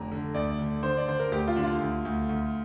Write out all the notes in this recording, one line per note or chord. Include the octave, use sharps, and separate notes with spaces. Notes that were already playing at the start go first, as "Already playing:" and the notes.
Already playing: F1 D3 A#5
D3
D2 D5
D3
D3 C5
D5
D3 C5
A#4
D2 G4
F4
D3 D4
F4
D2
D2
D2